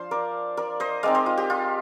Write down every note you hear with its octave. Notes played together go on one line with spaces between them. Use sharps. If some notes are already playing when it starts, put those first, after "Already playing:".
Already playing: F3 D4 C5 F5
A#4 D5
A#4 D5
C5 D#5
G#3 C4 D#4 D5 F5
C5 D#5
F4
G4
F4